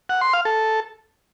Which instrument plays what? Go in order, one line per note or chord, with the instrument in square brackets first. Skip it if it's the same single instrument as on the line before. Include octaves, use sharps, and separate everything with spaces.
[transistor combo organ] F#5
C6
F5
A4